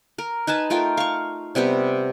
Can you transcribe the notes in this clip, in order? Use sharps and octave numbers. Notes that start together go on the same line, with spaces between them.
A#4
D#4 B4 G#5 A5
A3 F4 A#4 G5
F5 C#6
C3 G3 B3 G4